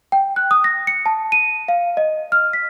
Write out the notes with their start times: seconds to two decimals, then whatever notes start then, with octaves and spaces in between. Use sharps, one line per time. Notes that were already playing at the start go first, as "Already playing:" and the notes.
0.12 G5
0.36 F#6
0.51 D#6
0.64 A#6
0.87 C#7
1.06 A5
1.32 D#7
1.68 F5
1.97 D#5
2.32 F6
2.53 B6